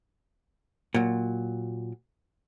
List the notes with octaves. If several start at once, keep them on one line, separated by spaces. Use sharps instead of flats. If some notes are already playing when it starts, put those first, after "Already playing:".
A#2 F#3